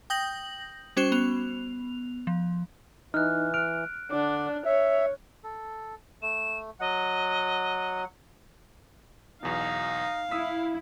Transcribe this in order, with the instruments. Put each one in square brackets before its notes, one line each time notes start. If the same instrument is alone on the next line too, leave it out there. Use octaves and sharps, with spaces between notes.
[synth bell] G5 D#6 G6 A#6 F#7
G3 C#4 F#4 C5 C#6 E7
B3 F7
F3
[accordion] E3 [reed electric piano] D#4 [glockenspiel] F6 F#6
[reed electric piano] F6 [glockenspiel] F#6 D7
[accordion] D3 D6 [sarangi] D4
[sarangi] C#5 [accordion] E5
[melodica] A4
[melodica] A3 [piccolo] E7
[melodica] F#3 F#5 [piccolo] D#5
[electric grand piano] B1 E2 B2 [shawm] D#4 [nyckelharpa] F5
[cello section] E4 [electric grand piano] D#6 E6 B6